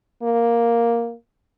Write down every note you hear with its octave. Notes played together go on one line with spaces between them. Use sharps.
A#3